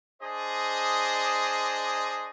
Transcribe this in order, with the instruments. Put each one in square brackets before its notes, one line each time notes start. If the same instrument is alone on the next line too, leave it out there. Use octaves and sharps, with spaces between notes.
[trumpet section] D4 G#4 C5 D#5